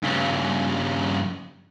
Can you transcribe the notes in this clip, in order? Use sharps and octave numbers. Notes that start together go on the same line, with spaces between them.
G2 C#3